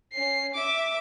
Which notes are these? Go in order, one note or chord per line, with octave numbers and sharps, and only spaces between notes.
C#4 C7
E5 D6